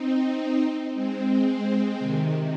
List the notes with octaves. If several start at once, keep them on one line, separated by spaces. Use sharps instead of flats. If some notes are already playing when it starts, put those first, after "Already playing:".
Already playing: C4 D#4
G#3 C4
G#3 C4
C3 D#3